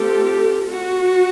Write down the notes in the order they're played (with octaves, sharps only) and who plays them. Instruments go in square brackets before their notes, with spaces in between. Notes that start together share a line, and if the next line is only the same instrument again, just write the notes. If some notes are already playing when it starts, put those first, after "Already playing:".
Already playing: [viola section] A3 C4 F4 G4 A4
F#4